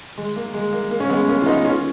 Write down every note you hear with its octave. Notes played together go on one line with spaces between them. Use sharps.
G#3
A#3
G#3
A#3
A#3
C#4
G#3 B3
A#3 C#4
F4
B3 D#4
C#4 F4